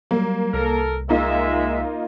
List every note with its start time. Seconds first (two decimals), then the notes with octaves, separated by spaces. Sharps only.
0.11 F#3 G3 A#3
0.54 C2 A4 A#4
1.09 G#3 A#3 D#4 F4 E5